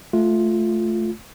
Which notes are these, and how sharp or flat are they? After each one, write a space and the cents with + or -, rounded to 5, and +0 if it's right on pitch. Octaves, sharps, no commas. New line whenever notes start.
A3 -10 F4 +0